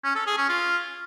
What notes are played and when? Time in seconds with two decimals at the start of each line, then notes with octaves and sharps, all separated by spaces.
0.04 C#4
0.16 A4
0.27 G#4
0.38 C#4
0.49 F4